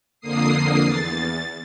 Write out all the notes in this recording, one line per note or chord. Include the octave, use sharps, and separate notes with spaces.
F2 D3 A#3 D#6 C7
E2 A6